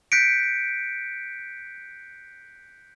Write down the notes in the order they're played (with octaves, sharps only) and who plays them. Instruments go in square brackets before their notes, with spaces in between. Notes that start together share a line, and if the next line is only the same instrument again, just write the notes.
[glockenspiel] F#6 G6 A#6 B6 C#7 D7